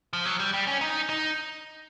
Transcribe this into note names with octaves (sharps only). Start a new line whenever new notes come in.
F3
F#3
G3
G3
C#4
D#4
D#4